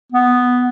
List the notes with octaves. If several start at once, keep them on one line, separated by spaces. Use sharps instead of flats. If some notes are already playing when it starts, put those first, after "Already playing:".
B3